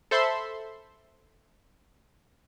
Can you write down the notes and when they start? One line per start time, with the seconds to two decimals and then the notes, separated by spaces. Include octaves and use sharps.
0.11 A4 C5 E5 B5 C6